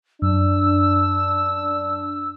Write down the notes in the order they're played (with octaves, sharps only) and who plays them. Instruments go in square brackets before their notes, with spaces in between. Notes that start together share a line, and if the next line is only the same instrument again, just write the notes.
[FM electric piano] F#2 [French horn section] D4 [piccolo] E6